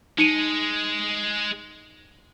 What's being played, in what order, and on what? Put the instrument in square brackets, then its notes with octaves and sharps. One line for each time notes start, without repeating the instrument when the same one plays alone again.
[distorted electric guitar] G#3 [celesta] D#4 C#7 D#7